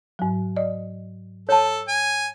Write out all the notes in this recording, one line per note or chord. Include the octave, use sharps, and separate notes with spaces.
G#2 F#3
D5 D#5
A4 C#5 A5
G#5